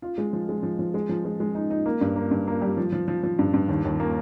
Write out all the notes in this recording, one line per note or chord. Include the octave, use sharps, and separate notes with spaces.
F4
G#3
F3
G#3
F3
F3
G#3
F3
G#3
G#3
D#4
D#4
A#3
G2
A#3
G2
A#3
G3
F3
F3
F3
F3
G2
G2
D#2
D#2
A#3